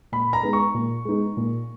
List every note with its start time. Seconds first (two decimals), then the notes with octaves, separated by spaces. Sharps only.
0.12 A#2 B5
0.33 A#5
0.43 G#3 B3 D#4
0.53 C#6
0.74 A#2
1.05 G#3 B3 D#4
1.37 A#2